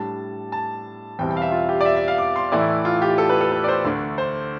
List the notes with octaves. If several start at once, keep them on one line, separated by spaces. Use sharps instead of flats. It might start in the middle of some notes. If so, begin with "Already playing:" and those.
Already playing: A2 G3 D4 A5
A5
E2 B2 G3 C4 E4 G5
G5
F5
E5
F4
G4
D5
E5
E5
F5
D6
C6
A2 E3 A3 E4 D5
F4
G4
A4
B4
A4
B4
D5
C5
D2 D3 A3 D4
C5